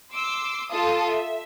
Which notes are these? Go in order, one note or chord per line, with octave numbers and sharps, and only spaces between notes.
C6 D6 E6
F4 A4 A5 D#6
E5